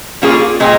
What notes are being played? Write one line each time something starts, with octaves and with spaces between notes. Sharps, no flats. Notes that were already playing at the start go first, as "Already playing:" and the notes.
G3 A#3 C#4 F4 G#4
A#2 G#3 C4